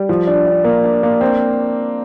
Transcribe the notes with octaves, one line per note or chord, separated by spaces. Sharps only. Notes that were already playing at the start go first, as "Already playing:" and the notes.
Already playing: G3
F3
D4
D4
A#3
D4
A#3
C4